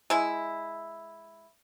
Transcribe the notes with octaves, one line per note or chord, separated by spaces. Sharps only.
G#3 E4